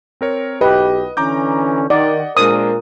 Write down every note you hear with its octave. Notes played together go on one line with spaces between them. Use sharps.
C4 A#4 C#5
B1 G4 B4 D#5
D3 E3 C#4 A#5 D6 G6
D#3 D5 D#5 F#5
A#2 G#3 D4 A#4 C5 D#6